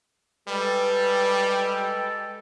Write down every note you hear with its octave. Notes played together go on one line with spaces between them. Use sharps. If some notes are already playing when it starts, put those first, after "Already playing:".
G3 G#3 G4 A4 B4